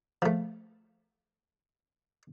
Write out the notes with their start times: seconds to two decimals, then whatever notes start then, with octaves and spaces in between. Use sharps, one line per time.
0.22 F3 A3